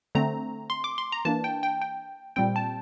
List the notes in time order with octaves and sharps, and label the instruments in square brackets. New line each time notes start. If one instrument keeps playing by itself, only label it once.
[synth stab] D3 A3 C4 A#5
C6
D6
C6
A#5
E3 A#3 D4 A5
G5
G5
G5
A#2 G3 C4 G5
A5